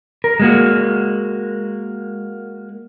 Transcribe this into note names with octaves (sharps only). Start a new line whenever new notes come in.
A#4
G#3 A#3 F#4